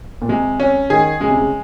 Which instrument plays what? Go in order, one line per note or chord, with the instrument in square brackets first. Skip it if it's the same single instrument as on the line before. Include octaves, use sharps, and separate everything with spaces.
[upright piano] A#2
[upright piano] C3 [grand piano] G#3
[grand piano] C#4
[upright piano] D#3 [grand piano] G#4
[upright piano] C#3 [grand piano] G#3
[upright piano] C3
C#3